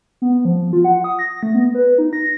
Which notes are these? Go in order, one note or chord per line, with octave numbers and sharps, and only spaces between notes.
B3
F3
F4
F#5
D#6
A#6
A3
B3
B4
D#4
A#6